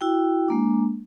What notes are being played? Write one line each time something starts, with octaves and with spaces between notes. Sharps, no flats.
E4 F#4 G5
G#3 A#3 D4